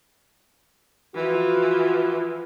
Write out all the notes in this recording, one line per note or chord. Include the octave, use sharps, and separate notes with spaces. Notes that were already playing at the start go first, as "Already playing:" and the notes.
E3 F3 F#4